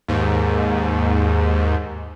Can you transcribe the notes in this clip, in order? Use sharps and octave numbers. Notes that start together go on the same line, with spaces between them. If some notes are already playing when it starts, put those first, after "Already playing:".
D#2 G#2